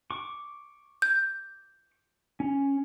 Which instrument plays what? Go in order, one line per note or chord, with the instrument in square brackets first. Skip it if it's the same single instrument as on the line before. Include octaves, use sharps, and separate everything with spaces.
[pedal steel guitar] C#6 D6
[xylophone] G6
[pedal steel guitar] C#4